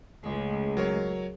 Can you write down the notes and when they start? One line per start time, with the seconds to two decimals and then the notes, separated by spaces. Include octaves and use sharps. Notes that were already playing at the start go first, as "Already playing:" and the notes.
0.23 C#2 A2 G#3
0.77 F#3 A#4 C#5